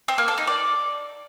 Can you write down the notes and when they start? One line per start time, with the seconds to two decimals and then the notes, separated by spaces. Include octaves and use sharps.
0.08 C4
0.18 A#3
0.28 A4
0.38 D#4
0.47 D5